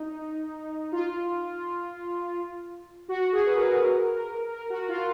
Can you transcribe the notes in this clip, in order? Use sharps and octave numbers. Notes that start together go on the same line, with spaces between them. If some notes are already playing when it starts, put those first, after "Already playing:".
Already playing: D#4
F4
F#4
G#4
B4
A#4
A#4
A#4
A#4
F#4
F4